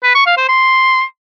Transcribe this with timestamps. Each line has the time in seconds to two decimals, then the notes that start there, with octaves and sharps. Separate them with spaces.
0.04 B4
0.15 C#6
0.26 F5
0.38 C5
0.49 C6